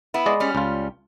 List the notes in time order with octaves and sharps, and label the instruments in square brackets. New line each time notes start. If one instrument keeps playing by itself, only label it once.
[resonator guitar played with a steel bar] B3 E4
[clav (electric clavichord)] G#3 D5 D#5
[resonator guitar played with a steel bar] G3 C#4
[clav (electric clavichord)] C#2 F4